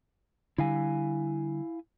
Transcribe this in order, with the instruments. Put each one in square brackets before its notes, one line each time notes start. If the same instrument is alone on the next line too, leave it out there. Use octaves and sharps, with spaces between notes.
[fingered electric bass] D3 G3 [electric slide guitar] E4 F5 G#5